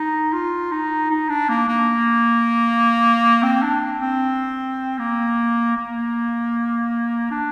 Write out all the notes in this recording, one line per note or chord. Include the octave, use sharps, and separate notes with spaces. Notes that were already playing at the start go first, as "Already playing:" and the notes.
Already playing: D#4
F4
D#4
D#4
D4
A#3
A#3
C4
D4
C4
A#3
A#3
D4